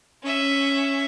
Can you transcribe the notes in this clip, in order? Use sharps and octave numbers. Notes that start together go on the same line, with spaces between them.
C#4 E5